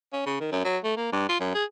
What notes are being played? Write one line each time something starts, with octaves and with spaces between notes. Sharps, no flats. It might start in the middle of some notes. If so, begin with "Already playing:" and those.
C#4
C#3
D#3
F#2
F#3
A3
A#3
G2
F4
F#2
G#4